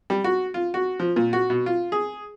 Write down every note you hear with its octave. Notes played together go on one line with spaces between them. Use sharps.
G3
F#4
F4
F#4
F3
A#2
F#4
B2
F4
G#4